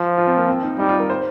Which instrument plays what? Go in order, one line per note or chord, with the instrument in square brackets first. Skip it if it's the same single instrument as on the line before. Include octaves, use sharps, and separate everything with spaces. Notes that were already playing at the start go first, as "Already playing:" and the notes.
Already playing: [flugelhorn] F3
[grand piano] F4
C4
A#3
C4
D#4
[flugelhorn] G3 [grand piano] D#4
[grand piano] F4
A#4
C5